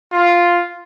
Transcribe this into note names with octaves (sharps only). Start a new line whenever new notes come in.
F4